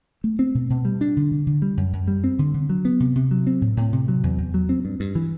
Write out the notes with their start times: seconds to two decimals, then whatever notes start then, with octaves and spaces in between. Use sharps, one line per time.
0.24 A3
0.39 C4
0.55 B2
0.70 B2
0.85 G3
1.01 D4
1.17 D3
1.31 D3
1.47 D3
1.62 G3
1.77 F#2
1.93 F#2
2.08 G3
2.24 C4
2.39 D3
2.54 D3
2.70 F#3
2.85 B3
3.00 C3
3.16 C3
3.31 F#3
3.47 C4
3.61 A2
3.77 A2
3.93 C3
4.08 F#3
4.23 E2
4.38 E2
4.54 F#3
4.69 C4
4.85 G2
5.00 G2
5.15 E3